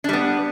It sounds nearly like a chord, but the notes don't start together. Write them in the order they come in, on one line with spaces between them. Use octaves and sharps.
D4 G3 B3